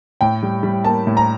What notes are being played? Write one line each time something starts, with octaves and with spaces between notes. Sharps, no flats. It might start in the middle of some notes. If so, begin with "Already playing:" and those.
A2 G5
G3
G3
A#3 A5
A2
A#5